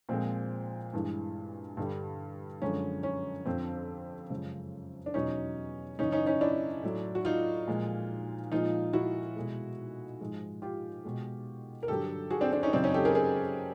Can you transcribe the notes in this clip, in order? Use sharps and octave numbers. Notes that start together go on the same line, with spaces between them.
A#2 F3 G#3 C4
G2 E3 G#3
G2 D3 G3
F#2 D3 F3 G#3 C#4
C#4
F2 D3 F3 C4
F#2 C#3 F3 G#3
D4
E2 B2 F#3 C#4 D#4
F#2 C#3 E3 C#4 D#4
C#4 D#4
C#4 D#4
D4 E4
A2 F#3
F#4
D#4 F4
A#2 F3 G#3
A#2 F3 G#3 D#4 F4
E4 F#4
B2 G#3
G#2 F3 G#3
F4 G4
B2 G#3
A#4
G2 D3 F#3 G4 A4
F#4 G#4
C4 D4
C4 D4
C#4 D#4
F#2 C#3 F#3 C4 D4
C#4 D#4
G4 A4
G#4 A#4
G#4 A#4